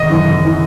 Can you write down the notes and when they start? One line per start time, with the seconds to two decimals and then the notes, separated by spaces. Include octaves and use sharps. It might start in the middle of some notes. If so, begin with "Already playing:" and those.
Already playing: G#1 D#5
0.09 F#2 E3
0.26 G#1
0.44 E3